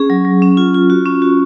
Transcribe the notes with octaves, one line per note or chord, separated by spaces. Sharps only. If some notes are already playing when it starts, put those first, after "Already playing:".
Already playing: C#4 G#4
F#3
F#3
C#4
F4
F4
F#4
C#4
F#4